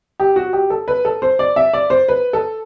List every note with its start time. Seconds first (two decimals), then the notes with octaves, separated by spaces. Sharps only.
0.20 G4
0.36 F#4
0.53 G4
0.70 A4
0.88 B4
1.05 A4
1.22 C5
1.39 D5
1.56 E5
1.73 D5
1.90 C5
2.08 B4
2.33 A4